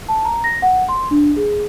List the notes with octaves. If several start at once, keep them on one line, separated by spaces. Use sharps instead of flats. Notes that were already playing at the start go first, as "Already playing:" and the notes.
A5
A#5
A#6
F#5
C6
D4
G#4